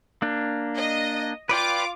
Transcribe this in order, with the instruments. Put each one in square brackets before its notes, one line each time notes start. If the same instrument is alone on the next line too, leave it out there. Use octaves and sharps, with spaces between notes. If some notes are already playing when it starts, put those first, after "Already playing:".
[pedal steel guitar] A#3 D4
[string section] D#5
[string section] F4 D6 [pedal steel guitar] B4 D5 G5